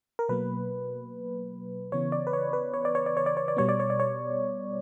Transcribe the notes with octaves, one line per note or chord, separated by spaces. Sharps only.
A#4
B2 F#3 A#3 B4
C#3 E3 B3 C#5
D5
B4
C#5
B4
C#5
D5
C#5
D5
C#5
D5
C#5
D5
B2 G3 B3 C#5
D5
C#5
D5
C#5